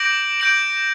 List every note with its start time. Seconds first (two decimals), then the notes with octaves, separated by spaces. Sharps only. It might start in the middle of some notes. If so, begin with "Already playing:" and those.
Already playing: D6 G6 A#6 D7 F#7
0.40 D6 G6 A#6 D7 F#7